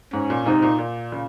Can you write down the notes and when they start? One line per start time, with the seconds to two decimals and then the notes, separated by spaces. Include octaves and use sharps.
0.13 G#2 C#4
0.30 A#2
0.46 G#2 C3 D#4
0.62 A#2
0.79 A#2
1.12 A#2 C#3